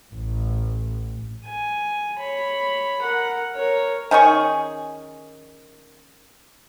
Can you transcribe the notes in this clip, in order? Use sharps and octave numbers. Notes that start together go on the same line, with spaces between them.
A1
G#5
C#5 B5
A#4 F#5
A#4 C#5
D#3 C#4 G#4 C#6